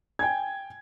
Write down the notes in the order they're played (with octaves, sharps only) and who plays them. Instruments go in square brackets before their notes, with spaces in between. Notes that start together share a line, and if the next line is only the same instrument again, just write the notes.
[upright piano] G5 G#5 G#6